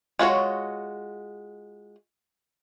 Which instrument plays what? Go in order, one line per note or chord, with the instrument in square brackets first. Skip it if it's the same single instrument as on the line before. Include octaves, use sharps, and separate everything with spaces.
[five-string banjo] G#3 F4 F#4 C#5